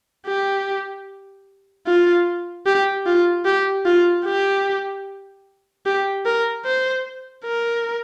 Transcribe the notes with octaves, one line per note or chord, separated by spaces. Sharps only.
G4
F4
G4
F4
G4
F4
G4
G4
A#4
C5
A#4